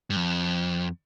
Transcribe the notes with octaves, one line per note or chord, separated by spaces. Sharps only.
G2
F2